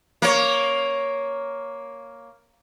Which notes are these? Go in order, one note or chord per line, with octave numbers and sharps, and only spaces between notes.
A#3 C#5